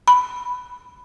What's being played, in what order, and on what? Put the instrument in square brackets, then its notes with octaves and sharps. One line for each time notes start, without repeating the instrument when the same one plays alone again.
[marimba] B5